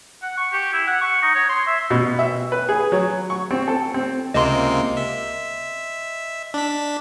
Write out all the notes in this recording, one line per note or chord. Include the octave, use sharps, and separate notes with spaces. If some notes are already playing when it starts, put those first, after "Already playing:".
F#5
C#6
G4
E4
F#5
C#6
D#4
C#5
C6
E5
B2
E5
B4
G#4
F#3
C#6
C4
A4
C4
C#2 C3 A#3 D#5 C6
E5
D4 B6